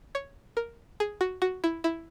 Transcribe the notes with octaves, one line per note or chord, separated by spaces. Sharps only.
C#5
A#4
G#4
F#4
F#4
E4
E4